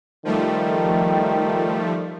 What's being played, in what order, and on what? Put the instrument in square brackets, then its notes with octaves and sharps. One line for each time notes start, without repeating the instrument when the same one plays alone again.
[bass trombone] D#3 [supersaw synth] F3 G3 A3